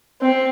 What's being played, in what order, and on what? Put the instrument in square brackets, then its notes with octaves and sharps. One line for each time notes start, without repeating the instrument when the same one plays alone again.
[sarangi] C4